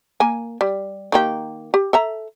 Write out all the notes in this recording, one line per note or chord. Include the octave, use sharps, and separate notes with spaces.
A#3 G#5
G3
D#3 A#3 G4
G4
A4 E5 A#5